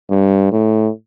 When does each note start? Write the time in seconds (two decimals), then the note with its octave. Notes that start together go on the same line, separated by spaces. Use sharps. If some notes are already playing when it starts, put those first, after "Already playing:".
0.10 G2
0.52 A2